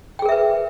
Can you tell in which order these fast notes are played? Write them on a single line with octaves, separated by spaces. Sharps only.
G5 G#4 A#4 E5 B4